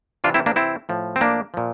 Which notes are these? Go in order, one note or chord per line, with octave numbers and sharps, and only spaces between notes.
C3 E3 D4 F4
C4 E4
A#3 D4
C4 E4
A2 F3
C4
A#3 D4
A#2 F3